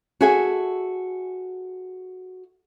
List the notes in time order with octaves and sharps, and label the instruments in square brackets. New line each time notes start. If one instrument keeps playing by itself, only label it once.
[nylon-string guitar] F#4 G#4 A4 E5 G#5